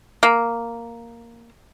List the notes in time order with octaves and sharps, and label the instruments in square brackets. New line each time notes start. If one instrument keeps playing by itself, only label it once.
[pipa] A#3